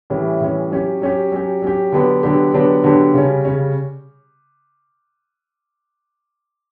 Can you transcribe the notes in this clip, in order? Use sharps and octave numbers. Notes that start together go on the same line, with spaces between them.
A2 E3 G3 C#4
A2 E3 G3 C#4
F#3 C#4 G4
F#3 C#4 G4
F#3 C#4 G4
F#3 C#4 G4
D3 F#3 B3 D4 G4
D3 F#3 B3 D4 G4
D3 F#3 B3 D4 G4
D3 F#3 B3 D4 G4
C#3 G3 C#4
C#3 G3 C#4